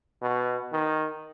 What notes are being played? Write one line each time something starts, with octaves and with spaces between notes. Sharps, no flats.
B2
D#3